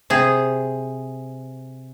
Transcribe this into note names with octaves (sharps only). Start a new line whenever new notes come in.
C3 G#4